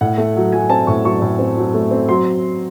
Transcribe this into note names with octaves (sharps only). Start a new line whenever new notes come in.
A2 F#5
A3
F#3
F#3 G#5
C4 A5
A2 C#6
F#3 C#6
A2
C4
F#3
A3
C4
F#3 C6